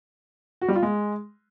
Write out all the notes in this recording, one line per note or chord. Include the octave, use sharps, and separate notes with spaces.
F#4
G3
F4
G#3